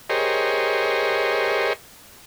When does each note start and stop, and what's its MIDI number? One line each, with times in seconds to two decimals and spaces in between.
0.10 1.73 67
0.10 1.73 68
0.10 1.73 70
0.10 1.73 72
0.10 1.73 73
0.10 1.73 75